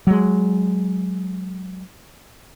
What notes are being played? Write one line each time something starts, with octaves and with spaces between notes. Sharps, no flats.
F#3 G#3